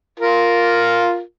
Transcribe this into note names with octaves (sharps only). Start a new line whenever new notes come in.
F4 A#4